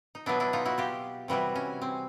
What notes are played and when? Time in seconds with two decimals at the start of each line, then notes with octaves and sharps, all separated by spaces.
0.15 D#4
0.26 B2 F#3 B3 D4 E4
0.40 D4 E4
0.53 D#4 F4
0.65 E4 F#4
0.78 F4 G4
1.28 C3 E3 G3 E4 F#4
1.55 C#4
1.82 C4